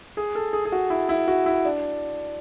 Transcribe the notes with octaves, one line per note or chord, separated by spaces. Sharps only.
G#4
A4
G#4
G#4
F#4
E4
E4
F#4
E4
D4